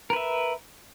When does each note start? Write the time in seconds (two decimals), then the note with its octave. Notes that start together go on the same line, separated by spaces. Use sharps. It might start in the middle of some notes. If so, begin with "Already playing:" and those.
0.10 A#4
0.13 B4
0.16 E5